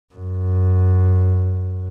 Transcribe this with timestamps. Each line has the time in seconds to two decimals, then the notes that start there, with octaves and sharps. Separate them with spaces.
0.14 F#2